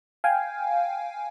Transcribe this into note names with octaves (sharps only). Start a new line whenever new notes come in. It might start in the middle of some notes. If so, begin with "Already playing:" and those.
F5 G5 G#5